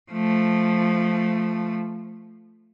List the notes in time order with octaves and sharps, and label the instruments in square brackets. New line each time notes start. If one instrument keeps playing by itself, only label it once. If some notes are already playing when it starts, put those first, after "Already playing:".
[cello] F3 A3